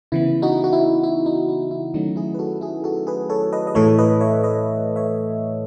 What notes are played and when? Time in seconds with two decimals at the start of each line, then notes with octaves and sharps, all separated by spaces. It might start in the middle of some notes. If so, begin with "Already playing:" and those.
0.12 C#3 E3 B3 E4
0.42 D#4 F#4
0.64 F#4
0.73 E4
1.03 E4
1.26 D#4
1.49 D#4
1.71 E4
1.94 D#3 F#3 A3 C#4 D#4 F#4
2.16 E4 G#4
2.34 B4
2.39 F#4 A4
2.61 E4 G#4
2.84 F#4 A4
3.07 G#4 B4
3.30 A4 C#5
3.52 B4 D#5
3.67 D#5
3.75 A2 E3 A3 A4 C#5
3.98 B4 D#5
4.21 C#5 E5
4.43 B4 D#5
4.96 C#5 E5